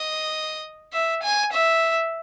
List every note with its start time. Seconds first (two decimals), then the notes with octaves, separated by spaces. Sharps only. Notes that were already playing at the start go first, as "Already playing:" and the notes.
Already playing: D#5
0.93 E5
1.23 G#5
1.53 E5